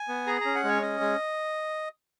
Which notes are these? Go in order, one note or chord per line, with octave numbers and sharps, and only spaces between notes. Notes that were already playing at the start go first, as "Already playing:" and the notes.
Already playing: G#5
B3
G#4 A#5
C#4 A#5
F#5
G#3 C#5
C#4 D#5
G#3